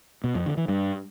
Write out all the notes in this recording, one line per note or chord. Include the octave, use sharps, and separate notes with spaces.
B2
F2
D3
E3
G2